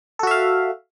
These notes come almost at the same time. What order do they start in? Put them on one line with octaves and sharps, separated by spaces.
A4 F#4 E5 F5